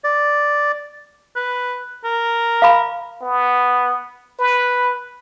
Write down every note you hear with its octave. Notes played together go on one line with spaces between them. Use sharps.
D5
B4
A#4
F5 B5
B3
B4